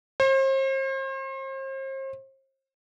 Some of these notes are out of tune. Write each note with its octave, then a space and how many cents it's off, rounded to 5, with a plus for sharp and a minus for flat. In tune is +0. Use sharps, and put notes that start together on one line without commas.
C5 +40